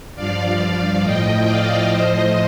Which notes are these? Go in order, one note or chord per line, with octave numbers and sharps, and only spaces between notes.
G2 F3 D5 F5
D5 F5
A2 F3 D#5 G5
D5 F5
A2 F3 C5 D#5